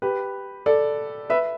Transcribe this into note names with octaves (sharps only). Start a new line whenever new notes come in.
G4 B4
A4 D5
B4 E5